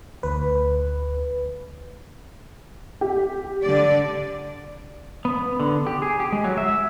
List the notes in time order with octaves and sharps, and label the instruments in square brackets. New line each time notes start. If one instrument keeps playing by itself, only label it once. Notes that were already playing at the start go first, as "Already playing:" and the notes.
[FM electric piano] D2 B4
[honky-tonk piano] G4
[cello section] D3 D5
[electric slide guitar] B3
D3
G4
G#4
G4
G#3
F#3
E5